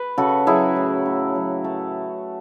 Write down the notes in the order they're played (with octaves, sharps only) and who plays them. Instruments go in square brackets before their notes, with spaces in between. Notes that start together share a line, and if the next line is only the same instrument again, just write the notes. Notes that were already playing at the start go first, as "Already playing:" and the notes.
Already playing: [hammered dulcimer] B4
C#3 F#4 A4
F#3 E4 G#4
A2
A2
F#3
A3